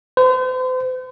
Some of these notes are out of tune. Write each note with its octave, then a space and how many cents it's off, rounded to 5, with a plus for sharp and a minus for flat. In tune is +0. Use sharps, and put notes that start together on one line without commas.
C5 -40